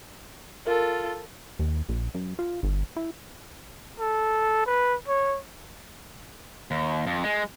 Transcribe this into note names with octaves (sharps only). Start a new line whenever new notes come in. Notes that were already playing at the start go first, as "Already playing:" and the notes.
F4 A4 A#4
D#2
A#1
F#2
F4
G1
E4
A4
B4
C#5
D#2
F2
G#3